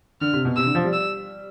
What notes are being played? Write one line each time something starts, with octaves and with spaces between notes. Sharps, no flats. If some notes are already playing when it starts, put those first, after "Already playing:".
D3 F6
C3
B2
C3 E6
D3
F3
G3
E6